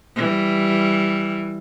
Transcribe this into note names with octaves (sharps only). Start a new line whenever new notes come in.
E3 G3